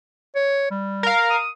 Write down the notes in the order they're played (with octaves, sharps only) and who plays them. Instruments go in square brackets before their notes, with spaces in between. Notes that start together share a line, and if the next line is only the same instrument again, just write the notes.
[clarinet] C#5
G3
[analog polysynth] A#4 F5
[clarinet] D#6